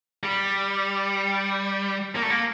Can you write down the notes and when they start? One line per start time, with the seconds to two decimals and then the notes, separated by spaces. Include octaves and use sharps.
0.23 G3
2.15 A#3
2.22 A3
2.30 A#3